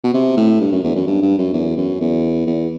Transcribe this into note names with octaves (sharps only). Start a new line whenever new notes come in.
B2
C3
A2
G2
F#2
E2
F#2
G2
G2
F#2
E2
F#2
E2
E2